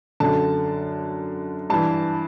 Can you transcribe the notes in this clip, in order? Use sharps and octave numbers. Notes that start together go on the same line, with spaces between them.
F#2 D3 A5
G2 E3 A5